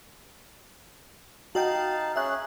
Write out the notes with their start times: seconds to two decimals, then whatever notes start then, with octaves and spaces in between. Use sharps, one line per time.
1.55 D#4 F#4 D#5 F5 G5 A5
2.16 C#4 G#4 E5 F#6